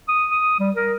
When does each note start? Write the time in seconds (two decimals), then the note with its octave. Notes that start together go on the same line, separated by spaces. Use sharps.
0.08 D#6
0.31 D#6
0.59 G3
0.76 A#4